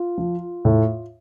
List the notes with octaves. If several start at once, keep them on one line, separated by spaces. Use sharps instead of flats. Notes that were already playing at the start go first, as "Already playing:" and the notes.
Already playing: F4
F3
A2